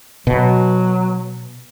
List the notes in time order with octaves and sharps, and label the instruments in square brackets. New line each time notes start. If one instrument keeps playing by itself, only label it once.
[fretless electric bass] B2 [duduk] F#3